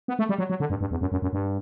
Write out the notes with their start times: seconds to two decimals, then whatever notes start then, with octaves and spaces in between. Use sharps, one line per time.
0.08 B3
0.19 A3
0.29 G3
0.39 F#3
0.50 F#3
0.60 D3
0.70 G2
0.81 G2
0.91 E2
1.01 F#2
1.12 F#2
1.22 F#2
1.33 G2